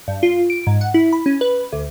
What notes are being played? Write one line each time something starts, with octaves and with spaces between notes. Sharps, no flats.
G2
F4
D7
G#2
F#5
E4
B5
C#4
B4
D2